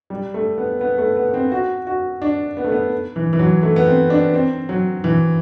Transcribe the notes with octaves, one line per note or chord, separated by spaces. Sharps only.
G3
A3
B3
B3
A3
B3
B3
C4
F#4
F#4
D4
B3
A3
B3
E3
E3
F#3
A3
B3
C4
D4
C4
F#3
E3